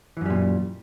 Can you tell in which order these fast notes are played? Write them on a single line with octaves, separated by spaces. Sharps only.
E3 F#2 G3 A#2